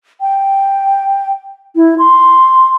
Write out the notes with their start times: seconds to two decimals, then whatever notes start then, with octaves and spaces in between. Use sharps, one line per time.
0.21 G5
1.76 E4
1.99 C6